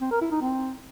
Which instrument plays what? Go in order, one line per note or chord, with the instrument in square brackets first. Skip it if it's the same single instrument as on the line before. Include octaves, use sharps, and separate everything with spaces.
[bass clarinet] C4
A#4
E4
D#4
C4